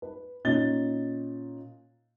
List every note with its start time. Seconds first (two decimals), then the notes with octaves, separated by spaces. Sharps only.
0.02 B4
0.45 A#2 C#4 D#4 A6 G7